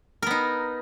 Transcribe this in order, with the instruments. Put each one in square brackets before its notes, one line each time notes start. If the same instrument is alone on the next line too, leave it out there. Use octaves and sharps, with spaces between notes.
[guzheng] A#4
B3
D#4